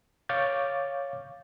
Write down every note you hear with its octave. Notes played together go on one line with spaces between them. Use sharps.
C#5 F5 C#6 D6 G6 A6